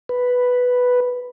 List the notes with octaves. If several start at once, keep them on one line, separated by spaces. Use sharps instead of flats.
B4